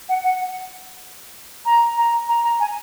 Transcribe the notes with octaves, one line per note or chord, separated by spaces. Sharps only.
F#5
F#5
A#5
A#5
A#5
A#5
G#5